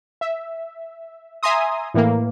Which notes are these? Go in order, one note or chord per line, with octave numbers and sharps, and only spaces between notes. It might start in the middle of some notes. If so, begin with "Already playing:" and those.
E5
E5 G#5 A#5 C6 D#6
A2 E3 A#3